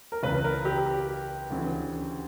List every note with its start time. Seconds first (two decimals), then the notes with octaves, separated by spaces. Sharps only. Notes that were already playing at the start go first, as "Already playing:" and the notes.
0.12 A#4
0.23 C#2 C#3 E3 B4
0.44 A#4
0.65 G4
1.50 D2 C#3 E3